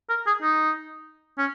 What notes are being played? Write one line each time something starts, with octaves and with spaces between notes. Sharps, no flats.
A#4
G#4
D#4
C#4